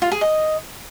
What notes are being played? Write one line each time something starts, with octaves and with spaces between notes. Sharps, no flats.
F4
G#4
D#5